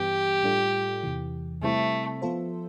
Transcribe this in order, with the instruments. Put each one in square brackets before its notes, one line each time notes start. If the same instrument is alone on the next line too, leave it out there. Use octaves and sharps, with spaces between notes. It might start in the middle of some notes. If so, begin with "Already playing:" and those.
Already playing: [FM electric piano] G2 E3 G3 B3 [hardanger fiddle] G4
[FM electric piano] A2 G3 D4 F4 A4
E2 C3 E3
[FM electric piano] C3 G3 C4 E4 [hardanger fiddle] A3
[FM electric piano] F3 B3 F4 A4 C5